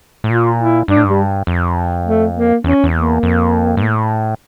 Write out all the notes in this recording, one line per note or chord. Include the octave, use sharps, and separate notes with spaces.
A2
A#2 F4
E4
G2 D4
A2
G2 G3
F2
A3
A#3
E2 C#4
E2
A#3
F2
G2
A2